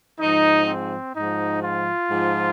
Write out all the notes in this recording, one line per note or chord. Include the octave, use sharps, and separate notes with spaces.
G#2 F3 D#4
C4
G#2 F3 D#4
F4
G#2 F3